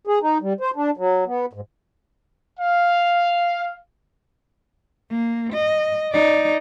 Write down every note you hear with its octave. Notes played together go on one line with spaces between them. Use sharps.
G#4
D#4
G3
C5
D4
F#3
B3
G#2
F5
A#3
D#5
D#4 D5